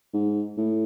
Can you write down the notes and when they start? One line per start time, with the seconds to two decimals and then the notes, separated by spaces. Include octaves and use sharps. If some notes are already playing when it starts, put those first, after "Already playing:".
0.13 G#2
0.57 A2